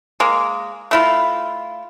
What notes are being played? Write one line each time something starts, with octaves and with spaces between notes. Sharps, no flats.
G#3 A#3
A3 E4 F4